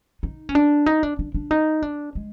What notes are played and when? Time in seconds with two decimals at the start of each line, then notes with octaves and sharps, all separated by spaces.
0.23 D#4
0.49 C#4
0.55 D4
0.86 D#4
1.03 D4
1.19 D4
1.34 D4
1.51 D#4
1.83 D4
2.15 G#3